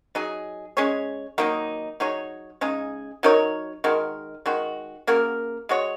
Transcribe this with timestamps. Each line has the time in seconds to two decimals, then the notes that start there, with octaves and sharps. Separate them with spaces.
0.15 F#3 D#4 G#4
0.77 G#3 C#4 G#4 C#5
1.38 D#3 F#3 A#3 D#4
2.00 F#3 D#4 G#4 C#5
2.61 C#3 G#3 D#4 G#4
3.23 F#3 D#4 A#4 C#5
3.84 D#3 G#3 F#4 A#4
4.46 D#3 G#3 F#4
5.07 C#3 A#3 F#4 A#4
5.69 G#3 F#4 C#5